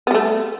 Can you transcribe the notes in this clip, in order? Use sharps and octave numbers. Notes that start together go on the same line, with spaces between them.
G3 A3 B3